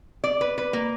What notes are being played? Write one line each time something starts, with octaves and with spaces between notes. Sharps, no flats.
D5
B4
B4
A#3